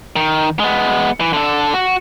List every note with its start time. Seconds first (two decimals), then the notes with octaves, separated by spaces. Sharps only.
0.16 D#3
0.60 G#3 B3
1.20 E3
1.33 D3 A4
1.74 F#4